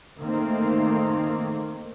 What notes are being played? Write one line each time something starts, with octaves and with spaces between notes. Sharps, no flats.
D#3 A3 A#3 C4